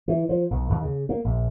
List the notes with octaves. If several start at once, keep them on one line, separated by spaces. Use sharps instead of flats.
E3
F3
B1
D#2
C#3
A#3
A#1